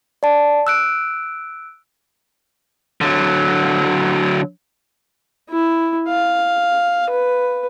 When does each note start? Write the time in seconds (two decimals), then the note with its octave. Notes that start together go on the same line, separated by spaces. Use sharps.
0.23 D5 A5
0.67 E6 F#6 D7
3.01 D3 F#3
5.50 E4
6.09 F5
7.10 B4